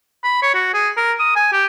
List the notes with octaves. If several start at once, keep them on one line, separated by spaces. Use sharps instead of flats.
B5
C#5
F#4
G#4
A#4
D#6
G#5
G4